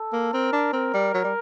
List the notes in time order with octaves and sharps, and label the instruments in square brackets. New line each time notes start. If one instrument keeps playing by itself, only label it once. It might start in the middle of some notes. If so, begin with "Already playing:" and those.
Already playing: [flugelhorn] A4
[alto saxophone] A#3
[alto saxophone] C4 [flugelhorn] A#4
[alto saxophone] D4
[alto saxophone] C4 [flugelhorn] A#4
[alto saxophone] G3
F#3
G3